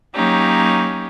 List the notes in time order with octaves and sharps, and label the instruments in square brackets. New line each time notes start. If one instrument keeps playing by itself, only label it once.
[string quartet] F#3 A#3 C#4 D#4 G4